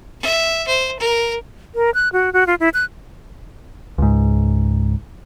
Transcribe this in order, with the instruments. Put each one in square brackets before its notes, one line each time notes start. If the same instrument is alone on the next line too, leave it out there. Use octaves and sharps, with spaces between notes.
[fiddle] E5
C5
A#4
[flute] A#4
F#6
F#4
F#4
F4
E4
F#6
[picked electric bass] C#2 G#2